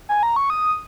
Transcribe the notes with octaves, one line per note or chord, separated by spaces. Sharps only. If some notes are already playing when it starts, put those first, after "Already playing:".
G#5
A#5
C#6
D#6